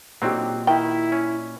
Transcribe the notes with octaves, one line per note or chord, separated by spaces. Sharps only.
A#2 D3 F#3 C4 D#4 G4
D#3 E4 G5
C#4